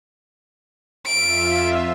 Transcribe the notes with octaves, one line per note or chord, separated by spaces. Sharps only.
F2 F4 E5 D7